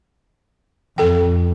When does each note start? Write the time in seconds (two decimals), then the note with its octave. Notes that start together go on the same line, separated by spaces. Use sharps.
0.98 F2 A4 G5